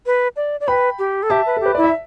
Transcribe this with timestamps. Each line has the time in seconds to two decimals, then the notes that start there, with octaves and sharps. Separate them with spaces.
0.06 B4
0.36 D5
0.60 D5
0.68 B4 G5 B5
0.99 G4
1.23 A4
1.30 G4 E5 A5
1.46 B4
1.57 A4
1.61 G4 B4
1.75 E4 D5
1.84 E5